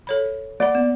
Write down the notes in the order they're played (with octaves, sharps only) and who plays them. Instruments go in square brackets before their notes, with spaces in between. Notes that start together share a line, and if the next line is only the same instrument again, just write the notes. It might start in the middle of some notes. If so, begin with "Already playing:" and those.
[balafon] A4 C#5 B5
[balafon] A#3 F#5 B5 [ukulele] D5
[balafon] B3